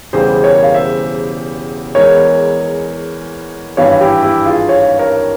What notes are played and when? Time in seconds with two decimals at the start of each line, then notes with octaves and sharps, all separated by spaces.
0.13 E1 E2 C#3 E3 G3 G#4 C5
0.44 A#4 C#5
0.63 F5
0.74 C5 E5
1.95 E2 E3 G#3 A#4 C#5
3.77 G#1 G2 E3 G3 C#5 F5
4.01 E4 G4
4.23 E4 G4
4.46 F4 G#4
4.69 C#5 F5
4.99 A#4 C#5